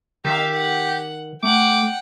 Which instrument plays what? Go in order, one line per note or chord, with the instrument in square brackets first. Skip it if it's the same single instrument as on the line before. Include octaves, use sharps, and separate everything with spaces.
[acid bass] D#3 [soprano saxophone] G4 [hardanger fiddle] E5 F5
[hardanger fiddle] F#5
[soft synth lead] A3 [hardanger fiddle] F#5 G5 [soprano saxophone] D6